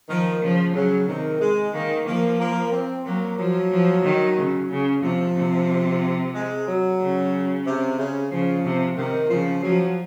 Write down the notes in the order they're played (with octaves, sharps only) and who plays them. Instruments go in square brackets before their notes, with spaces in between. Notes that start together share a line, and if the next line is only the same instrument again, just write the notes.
[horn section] D#3 [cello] F3
[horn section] C#3 [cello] F3
[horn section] C#3 [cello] F#3
[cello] C3 [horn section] D#3
[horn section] G#3
[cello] D#3 [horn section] A#3
[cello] F3 [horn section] A#3
[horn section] A#3
C4
[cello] F#3 [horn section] A#3
[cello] F3 [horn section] F#3
[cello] F3
D#3
C#3
C#3
[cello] C3 [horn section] F3
[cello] C3
[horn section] G#3
F#3
[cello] C#3
[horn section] C3
C#3
[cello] C#3 [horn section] F3
[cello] C3
[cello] C3 [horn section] D#3
[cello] C#3 [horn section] F3
[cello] F3 [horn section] F#3